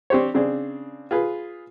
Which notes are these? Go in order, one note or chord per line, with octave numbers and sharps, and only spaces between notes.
C4 D4 G4 C5 C#5
C#3 C4 D4 G#4
F4 G#4 B4